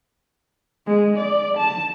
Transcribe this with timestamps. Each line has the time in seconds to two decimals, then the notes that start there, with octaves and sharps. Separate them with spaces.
0.86 G#3
1.17 D5
1.57 A5